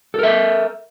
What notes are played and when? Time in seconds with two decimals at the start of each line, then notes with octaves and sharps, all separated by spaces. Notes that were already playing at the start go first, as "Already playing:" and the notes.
0.14 A4
0.19 A#4
0.23 E5